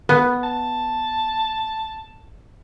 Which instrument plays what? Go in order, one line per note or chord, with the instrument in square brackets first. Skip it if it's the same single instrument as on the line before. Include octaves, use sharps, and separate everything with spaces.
[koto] B3
[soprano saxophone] A5